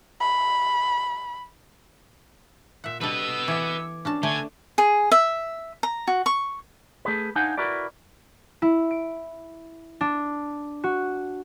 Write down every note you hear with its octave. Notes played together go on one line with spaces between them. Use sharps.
B5
A#2 E5 F#5
G3 D4 A4 B4 D#5 E6
E3 B3 D6 G#6 C#7
C#4 D4 F#4 A5
D3 A3 C#5 G#5
G#4
E5
A#5
F#4
C#6
A3 G#4 B4
D4 D#4 C5 F5 F#5 G#5
E4 F#4 A#4 B4 D5
E4
D7
D4
F#4